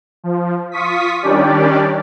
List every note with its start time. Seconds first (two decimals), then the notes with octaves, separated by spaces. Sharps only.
0.24 F3
0.71 F4 C#6 D#6 B6
1.22 D#3 G3 C#4 D4 G4 D5